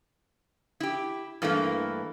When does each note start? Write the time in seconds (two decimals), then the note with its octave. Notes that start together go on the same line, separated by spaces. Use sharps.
0.80 E4 G4
1.42 G2 E3 A3 A#3